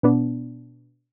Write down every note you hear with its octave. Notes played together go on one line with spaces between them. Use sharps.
B2 B3 D4